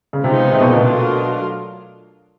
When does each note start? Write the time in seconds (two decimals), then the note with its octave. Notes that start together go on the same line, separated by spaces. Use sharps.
0.13 C#3
0.23 C3 F3 G#3 B3 D#4
0.53 C3
0.61 B2
0.69 A#2
0.76 B2
0.82 F#3 A3 D4 F4 A#4